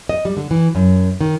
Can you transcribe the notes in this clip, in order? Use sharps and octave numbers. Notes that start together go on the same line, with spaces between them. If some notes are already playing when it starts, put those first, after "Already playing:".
D#5
G3
D3
E3
F#2
D#3